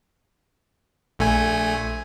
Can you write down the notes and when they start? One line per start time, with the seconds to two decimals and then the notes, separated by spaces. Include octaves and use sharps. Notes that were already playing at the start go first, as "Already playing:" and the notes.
1.19 A#1 A3 G#5